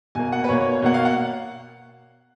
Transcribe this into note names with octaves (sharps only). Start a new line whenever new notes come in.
B2 A#3 G#5
F#5
B4
B2 A#3 C#5
C#5
C#5
B2 A#3 F#5
F5
F#5